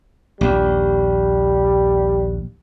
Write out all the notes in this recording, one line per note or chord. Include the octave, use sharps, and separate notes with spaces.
A#1 D#2 G3